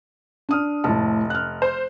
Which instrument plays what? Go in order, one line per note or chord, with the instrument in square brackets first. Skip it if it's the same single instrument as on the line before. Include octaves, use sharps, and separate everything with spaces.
[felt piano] D4 D#6 F6
[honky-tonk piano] F1 [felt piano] A2 A5
[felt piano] F6 F#6
[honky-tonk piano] C5